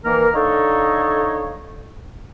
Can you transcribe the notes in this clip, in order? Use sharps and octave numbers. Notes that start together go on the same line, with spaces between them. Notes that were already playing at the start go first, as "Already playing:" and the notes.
D#3 E3 A#3 A#4
D3 D#4 A4 C#5 D#5 F5